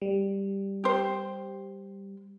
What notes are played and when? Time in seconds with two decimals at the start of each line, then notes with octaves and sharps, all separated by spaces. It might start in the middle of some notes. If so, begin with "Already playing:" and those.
0.02 G3
0.84 G4 C5